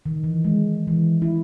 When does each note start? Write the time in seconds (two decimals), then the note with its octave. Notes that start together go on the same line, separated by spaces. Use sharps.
0.06 D#3
0.24 E3
0.45 G#3
0.87 E3
1.22 E4